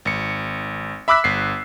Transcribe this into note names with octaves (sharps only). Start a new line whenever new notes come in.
G#1 C#7
E5 B5 D6 E6 F#6 B6
G1 C7